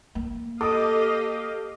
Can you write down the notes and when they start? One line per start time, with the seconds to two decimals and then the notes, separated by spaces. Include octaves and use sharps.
0.15 A#3
0.61 G4 A4 D#5 F5 D6 D#6